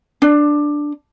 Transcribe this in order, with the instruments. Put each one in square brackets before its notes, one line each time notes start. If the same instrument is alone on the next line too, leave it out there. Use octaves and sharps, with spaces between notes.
[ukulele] D4